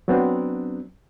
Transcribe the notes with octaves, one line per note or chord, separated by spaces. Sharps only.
F#3 B3 C4 D4